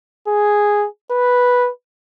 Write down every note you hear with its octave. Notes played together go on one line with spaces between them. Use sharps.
G#4
B4